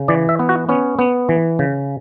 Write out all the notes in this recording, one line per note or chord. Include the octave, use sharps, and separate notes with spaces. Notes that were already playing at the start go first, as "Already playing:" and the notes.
Already playing: C#3
E3 D5
E5
B3
F#4
B3 C#4
B3
E3
C#3